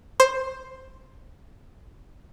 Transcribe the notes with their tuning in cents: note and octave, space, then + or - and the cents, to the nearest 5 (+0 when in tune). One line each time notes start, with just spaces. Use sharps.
C5 +10